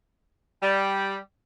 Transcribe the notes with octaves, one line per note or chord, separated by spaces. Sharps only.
G3